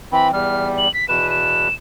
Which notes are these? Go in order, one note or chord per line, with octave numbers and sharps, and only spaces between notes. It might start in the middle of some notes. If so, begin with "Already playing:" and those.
E3 C4 B5
E2 G3 F6
F#7
B6
E2 B2 B4 E7
E7